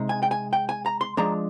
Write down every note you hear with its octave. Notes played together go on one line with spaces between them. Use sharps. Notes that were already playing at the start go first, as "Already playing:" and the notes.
Already playing: C3 G#3 D#4
G#5
G5
G#5
G5
G#5
A#5
C6
F3 G#3 D4 A#5